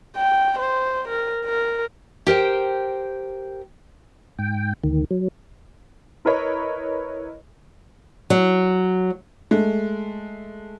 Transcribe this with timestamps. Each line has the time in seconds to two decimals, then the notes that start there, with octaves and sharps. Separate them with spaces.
0.16 G5
0.59 C5
1.08 A#4
1.45 A#4
2.27 G4 A#4 C5 G5
4.39 G#2 G5
4.84 D2 D#3
5.11 F#3
6.25 E4 A#4 B4 C#5 D#5
8.30 F#3
9.51 G#3 A3